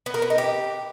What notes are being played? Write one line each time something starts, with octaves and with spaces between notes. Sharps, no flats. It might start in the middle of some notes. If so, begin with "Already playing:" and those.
B3
A#4
B3
D#4
G4